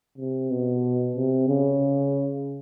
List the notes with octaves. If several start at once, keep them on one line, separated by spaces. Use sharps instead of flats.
C3
B2
C3
C#3